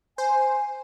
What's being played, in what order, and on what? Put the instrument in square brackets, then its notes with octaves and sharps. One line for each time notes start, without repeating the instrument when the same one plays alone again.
[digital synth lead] C5 [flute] G#5